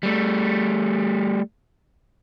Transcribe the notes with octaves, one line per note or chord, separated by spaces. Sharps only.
G3 A3